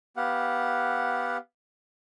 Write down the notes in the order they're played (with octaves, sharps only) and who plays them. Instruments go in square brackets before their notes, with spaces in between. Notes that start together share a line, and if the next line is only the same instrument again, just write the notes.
[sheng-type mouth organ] B3 G4 F5 F#5